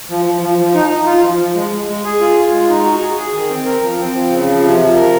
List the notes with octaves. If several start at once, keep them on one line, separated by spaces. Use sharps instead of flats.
F3
F3
F3
F3
D#4
D#4
F4
F3
F3
G#3
G#3
G#3
G#4
F4
F4
G#3
D#4
F#4
G#4
G#4
D#3
C4
A#4
F3
C4
F3
C#3
F3
C3
F3
A#4